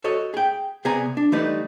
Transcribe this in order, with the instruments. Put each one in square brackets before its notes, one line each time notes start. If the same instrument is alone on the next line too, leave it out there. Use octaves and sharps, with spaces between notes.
[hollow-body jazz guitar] F#4 A4 C#5 D#5
G#4 G5
C3 B3 G#4 D5 G#5 A#5
D4
E3 G3 A3 D#4 B4 D5